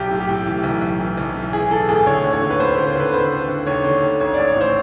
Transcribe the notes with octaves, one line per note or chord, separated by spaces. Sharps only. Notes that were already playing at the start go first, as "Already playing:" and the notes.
Already playing: B1 G4
A2
G4
A2
E3
B1
B1
E3
B1
E3
E3 G#4
E3 A4
A2 G#4
D3 C#5
D#2
C#5
D3
B4
D#2 C5
C5
D3
C5
D3 B4
D3 C5
D3
D3
D#2 C#5
D3
D#2
A1 C#5
A1 D5
C#5
A2 C5